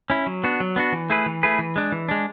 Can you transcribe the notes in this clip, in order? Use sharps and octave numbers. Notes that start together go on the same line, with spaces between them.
C#4 E4
F#3
B3 D4 F#4
F#3
B3 D4 F#4
E3
A3 E4 G#4 B4
E3
A3 E4 G#4 B4
E3
G#3 D4
E3
G#3 D4